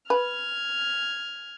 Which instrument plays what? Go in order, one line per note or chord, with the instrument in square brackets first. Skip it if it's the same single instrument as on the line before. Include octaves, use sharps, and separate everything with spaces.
[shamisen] B4 [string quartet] F6 G#6